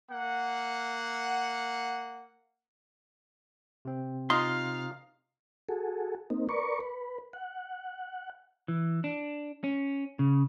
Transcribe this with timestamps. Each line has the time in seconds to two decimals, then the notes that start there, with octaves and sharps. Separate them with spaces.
0.10 A#3 F#5
3.85 C3 C4
4.30 D#4 F4 D#5 F5 C6
5.69 F#4 G#4 A4
6.30 A#3 C4 D#4
6.49 A#4 B4 D5 C#6
6.80 B4
7.33 F#5
8.68 E3
9.04 D4
9.64 C#4
10.19 C#3